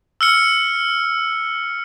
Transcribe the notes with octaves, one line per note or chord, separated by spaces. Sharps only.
E6 F6 C#7